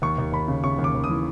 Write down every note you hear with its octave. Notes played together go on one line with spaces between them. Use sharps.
D#2 C#6
D#2
D#2 B5
C#3
C#3 C#6
D#2
D6
D#2
D#6
E3